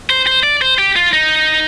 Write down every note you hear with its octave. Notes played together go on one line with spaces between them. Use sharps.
C5
C5
D5
C5
G4
F4
D#4